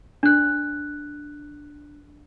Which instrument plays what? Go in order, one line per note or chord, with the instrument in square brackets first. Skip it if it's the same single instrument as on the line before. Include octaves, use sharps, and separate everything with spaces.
[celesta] D4 F#6